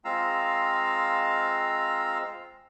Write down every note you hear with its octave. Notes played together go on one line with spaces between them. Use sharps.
G#3 C4 F4 F5 A#5 E6